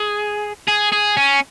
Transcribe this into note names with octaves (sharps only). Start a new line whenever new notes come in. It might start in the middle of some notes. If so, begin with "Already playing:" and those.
Already playing: G#4
G#4
G#4
C#4